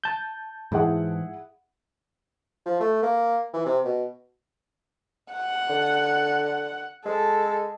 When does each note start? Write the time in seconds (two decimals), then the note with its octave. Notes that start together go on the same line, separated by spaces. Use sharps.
0.04 A5 G6
0.72 G#2 E3 E4 G#4 F#5
2.65 F3
2.80 A3
3.02 A#3
3.53 E3
3.66 C3
3.84 B2
5.32 F#5
5.69 D3
7.06 G#3 A4